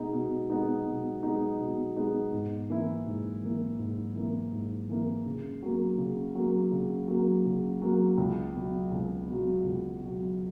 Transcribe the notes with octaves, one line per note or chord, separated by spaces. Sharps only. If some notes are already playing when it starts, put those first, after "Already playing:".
Already playing: B2 G#3 B3 D#4
B2
G#3 B3 D#4
B2
G#3 B3 D#4
B2
G#3 B3 D#4
G#2
E3 A#3 E4
G#2
E3 A#3 E4
G#2
E3 A#3 E4
G#2
E3 A#3 E4
C#3
F#3 A#3
C#3
F#3 A#3
C#3
F#3 A#3
C#3
F#3 A#3
C#2
B2 F#3
C#2
B2 F#3
C#2
B2 F#3